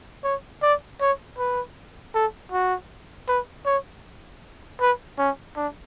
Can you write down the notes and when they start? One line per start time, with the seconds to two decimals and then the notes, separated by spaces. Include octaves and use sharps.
0.24 C#5
0.62 D5
1.00 C#5
1.38 B4
2.15 A4
2.52 F#4
3.28 B4
3.66 C#5
4.80 B4
5.18 C#4
5.56 D4